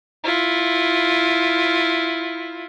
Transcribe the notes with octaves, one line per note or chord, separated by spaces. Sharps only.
E4 F4